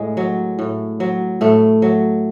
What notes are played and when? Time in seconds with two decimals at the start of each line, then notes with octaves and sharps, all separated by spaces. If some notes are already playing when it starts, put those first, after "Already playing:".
Already playing: A2 G#3
0.17 F#3
0.59 A2
1.00 F#3
1.41 A2 A3
1.82 F#3